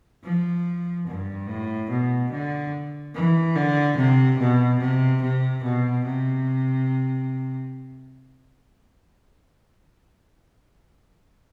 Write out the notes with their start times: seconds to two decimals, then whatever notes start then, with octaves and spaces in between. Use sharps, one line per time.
0.24 F3
1.07 G2
1.48 A2
1.90 B2
2.31 D3
3.15 E3
3.55 D3
3.97 C3
4.39 B2
4.80 C3
5.22 C3
5.63 B2
6.05 C3